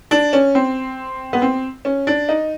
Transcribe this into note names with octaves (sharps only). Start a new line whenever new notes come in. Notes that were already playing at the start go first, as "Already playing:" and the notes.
D4
C#4
C4
B3
C4
C#4
D4
D#4